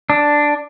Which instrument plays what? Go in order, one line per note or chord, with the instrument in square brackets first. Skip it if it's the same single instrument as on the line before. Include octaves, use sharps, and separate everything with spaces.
[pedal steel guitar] D4